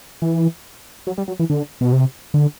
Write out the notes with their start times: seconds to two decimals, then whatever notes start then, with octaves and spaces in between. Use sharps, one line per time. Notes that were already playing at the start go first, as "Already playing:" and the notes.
0.22 E3
1.07 F#3
1.18 G3
1.28 F#3
1.40 E3
1.50 D3
1.81 B2
1.93 C3
2.34 D3